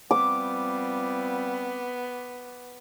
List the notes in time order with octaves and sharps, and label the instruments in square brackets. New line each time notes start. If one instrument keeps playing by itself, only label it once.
[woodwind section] F3 G3 C4 [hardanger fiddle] B3 [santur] D6